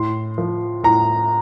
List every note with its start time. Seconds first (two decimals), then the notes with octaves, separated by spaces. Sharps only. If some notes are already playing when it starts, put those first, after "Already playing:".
Already playing: A2 C6
0.38 F3
0.83 A2 A#5